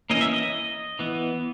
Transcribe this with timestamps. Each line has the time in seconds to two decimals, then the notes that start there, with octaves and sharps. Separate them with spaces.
0.10 E3 A#3 C#4 D#5
0.21 E5
0.33 D#5
0.99 E3 B3